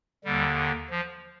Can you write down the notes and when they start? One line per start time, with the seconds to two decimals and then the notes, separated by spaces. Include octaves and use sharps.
0.25 D#2 D3 G3
0.90 F3